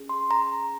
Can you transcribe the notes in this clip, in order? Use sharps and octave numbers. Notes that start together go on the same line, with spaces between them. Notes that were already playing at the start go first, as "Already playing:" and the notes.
Already playing: C#4 G#4
C6
A#5